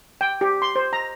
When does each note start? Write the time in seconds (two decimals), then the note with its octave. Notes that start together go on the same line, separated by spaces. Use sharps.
0.21 G5
0.41 G4
0.62 C6
0.76 C5
0.93 A#5